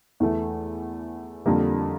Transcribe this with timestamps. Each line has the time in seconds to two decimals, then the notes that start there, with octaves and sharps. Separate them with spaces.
0.20 E2 E3 A3
1.46 F2 D3 G3 A#3